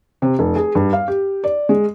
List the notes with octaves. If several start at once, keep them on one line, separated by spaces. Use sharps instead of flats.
C3
F1
G#4
G2
F5
G4
D5
G#3